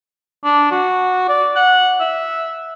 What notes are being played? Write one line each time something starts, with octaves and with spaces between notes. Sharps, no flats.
D4
F#4
D5
F#5
E5